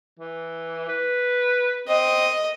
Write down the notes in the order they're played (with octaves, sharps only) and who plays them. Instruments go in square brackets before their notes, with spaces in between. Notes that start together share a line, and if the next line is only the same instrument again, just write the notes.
[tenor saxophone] E3
B4
[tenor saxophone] C4 [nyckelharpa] D#5